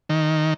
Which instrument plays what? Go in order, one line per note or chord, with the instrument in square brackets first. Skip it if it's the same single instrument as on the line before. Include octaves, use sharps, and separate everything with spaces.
[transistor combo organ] D#3